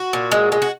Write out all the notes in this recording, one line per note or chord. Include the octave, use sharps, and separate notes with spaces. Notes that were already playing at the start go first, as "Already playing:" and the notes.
Already playing: F#4
A#2
G#3
G#3
F#4